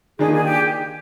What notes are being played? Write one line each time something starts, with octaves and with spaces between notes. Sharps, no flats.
D#3 A#3 D4 F4 G#4
G#4
G4